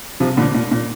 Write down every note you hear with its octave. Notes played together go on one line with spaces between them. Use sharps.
C3 F3
A#2 D3
A#2
A#2